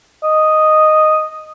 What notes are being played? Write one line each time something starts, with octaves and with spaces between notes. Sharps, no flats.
D#5